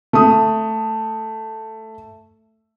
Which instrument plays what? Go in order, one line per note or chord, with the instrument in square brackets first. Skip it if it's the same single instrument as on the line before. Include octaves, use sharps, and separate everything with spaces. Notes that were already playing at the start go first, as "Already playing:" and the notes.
[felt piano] A3 D#6